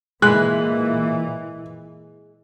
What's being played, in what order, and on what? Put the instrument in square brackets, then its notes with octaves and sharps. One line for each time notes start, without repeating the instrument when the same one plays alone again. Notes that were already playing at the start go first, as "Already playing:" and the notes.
[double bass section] A#2 E3 [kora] G#3 B4 [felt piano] F#6